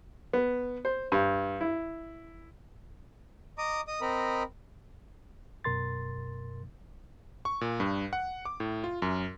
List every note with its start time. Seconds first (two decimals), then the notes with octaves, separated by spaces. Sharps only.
0.33 B3
0.85 C5
1.12 G2
1.61 E4
3.58 D#5 A#5 D6 D#6
3.88 D#5 D#6
4.01 C4 A#4 D#5 B5
5.64 F#2 B2 A#4 C6 A6
7.45 C#6
7.61 A#2
7.80 G2
8.13 F#5
8.45 D6
8.60 A2
8.84 F4
9.02 F#2